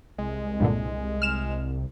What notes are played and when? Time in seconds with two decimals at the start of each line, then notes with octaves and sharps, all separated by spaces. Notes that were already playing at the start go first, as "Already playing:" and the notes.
0.18 C2 G#3
0.60 G2 A#2 D3
1.22 F6 E7